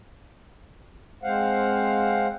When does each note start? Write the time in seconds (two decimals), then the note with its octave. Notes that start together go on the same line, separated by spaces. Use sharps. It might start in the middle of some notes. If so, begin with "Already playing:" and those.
1.23 G#3 C4 C5 F5 F#5